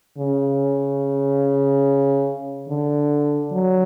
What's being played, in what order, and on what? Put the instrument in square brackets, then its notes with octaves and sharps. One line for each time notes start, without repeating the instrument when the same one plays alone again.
[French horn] C#3
D3
F#3